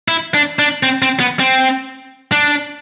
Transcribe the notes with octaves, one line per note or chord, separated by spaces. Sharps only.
E4
D4
D4
C4
C4
B3
C4
D4